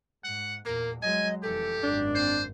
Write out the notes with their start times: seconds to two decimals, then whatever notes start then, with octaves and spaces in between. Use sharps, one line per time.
0.24 G#2 F#5
0.65 E2 A#2 A#3 A#4
1.02 F#3 G#3 D#5 G#5
1.43 F1 E3 G4 A4
1.83 G#1 F#2 D4
2.15 C4 C5